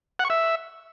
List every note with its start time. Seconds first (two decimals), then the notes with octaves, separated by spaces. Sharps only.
0.19 F#5
0.25 C#6
0.30 E5